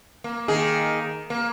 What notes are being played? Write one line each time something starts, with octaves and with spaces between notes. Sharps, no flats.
A#3
D#3 A#3 G#4
A#3